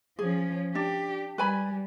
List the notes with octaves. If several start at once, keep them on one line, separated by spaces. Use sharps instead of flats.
F3 C#4 G#4
D4 G4
G3 B4 G#5 B5